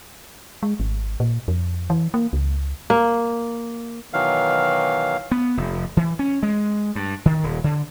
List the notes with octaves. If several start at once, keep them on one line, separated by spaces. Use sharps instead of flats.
G#3
G#1
A#2
F2
E3
A#3
C#2
A#3
B2 D#3 E3 F#3 F5
B3
F1
E3
C#4
G#3
G2
D#3
D#1
D3